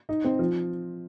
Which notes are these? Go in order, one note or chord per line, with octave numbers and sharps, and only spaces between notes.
D#4
C4
F3